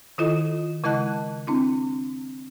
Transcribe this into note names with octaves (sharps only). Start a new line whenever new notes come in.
D#3 E4 F4 A4 D#5
C#3 G#3 E4 D#5 A5 F#6
C4 D4 E4